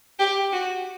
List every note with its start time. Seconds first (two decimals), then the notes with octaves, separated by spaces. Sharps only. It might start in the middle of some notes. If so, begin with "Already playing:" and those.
0.19 G4
0.53 F#4